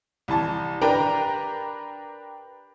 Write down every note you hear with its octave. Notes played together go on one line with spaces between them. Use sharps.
C2 E3 A5
D4 G4 A#4 B4 G5 A#5